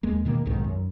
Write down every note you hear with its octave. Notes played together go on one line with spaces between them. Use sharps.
D#2 G#3 A#3
B2 D#3 F3 A#3
B1 F2 G#2 D#3
F#2